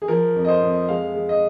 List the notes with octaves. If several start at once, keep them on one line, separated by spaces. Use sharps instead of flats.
G#4
F3 A#4
F2
D#5
C5
F2
G#3 F5
G#3
D#5